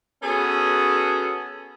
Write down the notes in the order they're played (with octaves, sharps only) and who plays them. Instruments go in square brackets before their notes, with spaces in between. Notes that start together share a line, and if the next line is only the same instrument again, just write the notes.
[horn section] B3 C#4 F#4 G#4 A4